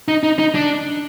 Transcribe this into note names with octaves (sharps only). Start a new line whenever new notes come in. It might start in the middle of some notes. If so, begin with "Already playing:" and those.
D#4
D#4
D#4
D4